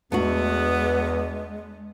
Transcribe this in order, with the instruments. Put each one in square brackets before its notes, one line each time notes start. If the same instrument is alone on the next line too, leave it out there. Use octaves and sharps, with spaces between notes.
[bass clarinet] E2 [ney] G#3 [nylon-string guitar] A3 D4 F#4 [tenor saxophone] B3